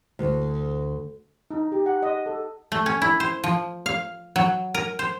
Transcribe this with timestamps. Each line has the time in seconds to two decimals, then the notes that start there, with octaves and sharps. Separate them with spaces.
0.19 D2
1.51 D#4
1.72 G4
1.86 F#5
2.03 D#5
2.26 A4
2.72 A3
2.86 C#4
3.02 E4
3.20 C5
3.44 F3
3.86 F5
4.36 F#3
4.74 A#4
4.99 C5